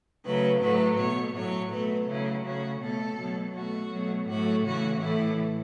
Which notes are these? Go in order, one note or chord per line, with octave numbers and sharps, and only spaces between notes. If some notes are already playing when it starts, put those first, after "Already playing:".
C#3 F#3 A3 B4
A2 F#3 A3 B4
B2 A3 C#5
A2 F#3 A3 C#5
B2 F#3 A3 B4
C#3 F#3 A3 E4
C#3 A3 F#4
B2 A3 A4
B2 F#3 A3
B2 A3 F#4
B2 F#3 A3
A2 F#3 A3 F#4
C#3 E3 A3 F#4
A2 E3 A3 E4